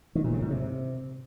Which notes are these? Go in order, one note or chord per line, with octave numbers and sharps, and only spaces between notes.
D#3
A#2
C#3
G#2
C3